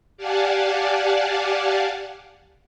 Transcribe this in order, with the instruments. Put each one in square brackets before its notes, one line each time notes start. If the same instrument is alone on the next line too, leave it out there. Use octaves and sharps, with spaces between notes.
[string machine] G4 D5 F5 F#5 G#5 A5